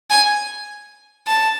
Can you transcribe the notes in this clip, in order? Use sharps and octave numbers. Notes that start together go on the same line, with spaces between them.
G#5
A5